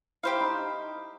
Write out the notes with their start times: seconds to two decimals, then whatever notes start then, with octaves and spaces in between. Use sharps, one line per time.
0.23 E4 G4 C5 F5
0.40 D#4